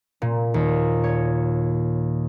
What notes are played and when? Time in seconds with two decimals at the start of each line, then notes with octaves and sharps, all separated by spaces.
0.22 A#2
0.54 D#2
1.04 C#5